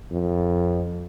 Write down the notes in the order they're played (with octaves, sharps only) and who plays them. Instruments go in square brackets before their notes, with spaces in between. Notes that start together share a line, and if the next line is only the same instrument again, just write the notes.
[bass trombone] F2